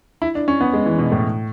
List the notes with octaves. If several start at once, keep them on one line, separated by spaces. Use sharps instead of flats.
E4
D4
C#4
B3
G#3
E3
B2
A2